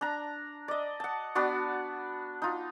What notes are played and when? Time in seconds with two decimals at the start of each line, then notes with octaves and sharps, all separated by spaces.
0.01 D4 A#5
0.68 D5 D#5
1.00 F#5 A5
1.35 B3 D4 F#4 D5
2.42 D#4 F4